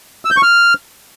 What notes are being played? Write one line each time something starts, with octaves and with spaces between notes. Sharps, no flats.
E6
G6
C#6
F6